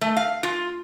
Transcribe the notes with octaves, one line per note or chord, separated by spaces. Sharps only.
A3
F5
F4